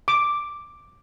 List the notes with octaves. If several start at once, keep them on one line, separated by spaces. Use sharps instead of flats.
D6